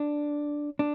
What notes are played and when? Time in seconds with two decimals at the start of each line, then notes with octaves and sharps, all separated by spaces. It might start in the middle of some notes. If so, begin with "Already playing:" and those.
Already playing: D4
0.79 D4